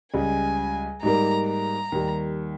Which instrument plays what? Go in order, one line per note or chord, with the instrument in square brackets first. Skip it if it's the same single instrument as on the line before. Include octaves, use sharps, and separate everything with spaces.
[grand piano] C#2 C#3 G3 [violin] G#5
[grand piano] G#2 G3 A#3 [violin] A#5
[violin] A#5
[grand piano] D#2 D#3 G3